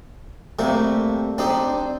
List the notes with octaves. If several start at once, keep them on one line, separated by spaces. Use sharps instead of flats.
C3 G3 A3 A#3
C4 D4 D#4 G4